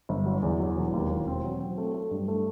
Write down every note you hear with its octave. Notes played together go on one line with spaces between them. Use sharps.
G1
F#3
E2
F#3
E1
D#2
E1
C4
F#3
C4
A3
A3
G2
A3